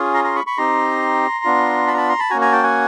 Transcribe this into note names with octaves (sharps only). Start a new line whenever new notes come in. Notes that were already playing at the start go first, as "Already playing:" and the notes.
Already playing: C#4 F4 G#4
A#5 C6
A#5 C6
B5 C#6
B5 C#6
C4 D#4 G4 A#5 C6
B3 D4 F4
A5 B5
A#5
A5 B5
A#5 C6
A5 B5
A#3 C#4 F#4 G#5 A#5
G#5 A#5
G5 A5
F#5 G#5